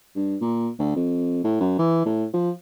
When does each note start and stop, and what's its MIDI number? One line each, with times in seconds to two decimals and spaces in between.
0.16 0.36 43
0.41 0.69 46
0.79 0.93 38
0.96 1.43 41
1.44 1.60 45
1.60 1.77 42
1.79 2.03 52
2.06 2.26 45
2.34 2.51 53